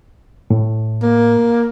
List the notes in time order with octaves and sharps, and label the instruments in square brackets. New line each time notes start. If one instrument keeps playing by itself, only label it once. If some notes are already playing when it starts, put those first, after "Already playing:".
[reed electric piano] A2
[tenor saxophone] A#3